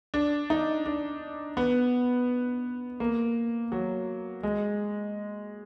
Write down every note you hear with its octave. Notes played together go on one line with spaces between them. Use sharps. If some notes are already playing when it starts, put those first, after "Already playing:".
D4
D#4
D4
B3
A#3
F#3
G#3